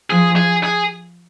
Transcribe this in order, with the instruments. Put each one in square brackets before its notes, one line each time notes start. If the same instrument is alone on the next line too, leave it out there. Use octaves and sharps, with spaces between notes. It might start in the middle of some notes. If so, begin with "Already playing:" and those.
[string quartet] F3 [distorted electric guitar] G#4
[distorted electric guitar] G#4
G#4